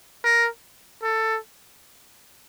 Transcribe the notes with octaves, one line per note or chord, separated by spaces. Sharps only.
A#4
A4